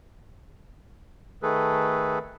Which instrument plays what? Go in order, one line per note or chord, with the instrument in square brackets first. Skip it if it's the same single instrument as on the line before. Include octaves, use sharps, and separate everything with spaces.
[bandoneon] D#3 A3 G#4 A4 B4